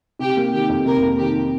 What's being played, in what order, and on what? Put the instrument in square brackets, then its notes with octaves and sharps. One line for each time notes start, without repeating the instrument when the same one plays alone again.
[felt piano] C3 [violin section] G4
[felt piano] A#3
[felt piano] D#3 [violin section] G4
[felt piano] F2
[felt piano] C3 [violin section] A#4
[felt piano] A#3
[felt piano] D#3 [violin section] G4